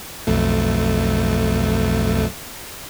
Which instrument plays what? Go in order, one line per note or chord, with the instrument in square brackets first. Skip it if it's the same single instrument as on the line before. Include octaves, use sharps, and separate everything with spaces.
[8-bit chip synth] B1 F2 A3